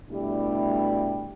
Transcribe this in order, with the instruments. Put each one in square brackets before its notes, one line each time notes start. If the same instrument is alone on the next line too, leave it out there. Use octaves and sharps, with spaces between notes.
[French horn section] B2 G3 A3 D4 E4 G4